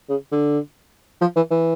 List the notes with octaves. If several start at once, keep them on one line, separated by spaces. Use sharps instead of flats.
C#3
D3
F3
E3
E3